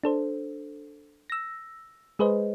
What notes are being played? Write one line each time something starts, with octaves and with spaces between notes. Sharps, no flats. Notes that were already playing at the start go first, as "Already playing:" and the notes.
D4 A4 C5
E6 A#6
G#3 G#4 B4 C5 D#5